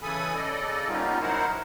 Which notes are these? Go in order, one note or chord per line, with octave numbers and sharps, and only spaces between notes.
C#3 E3 A4 G#5 B5 D#6
C#3 A4 D5 D#5
G3 A#3 B3 C#4 D#4 F4
F#3 D#4 E4 A#4 C5 F#5